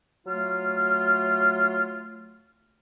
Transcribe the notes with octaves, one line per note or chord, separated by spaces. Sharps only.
F#3 A3 F4 F6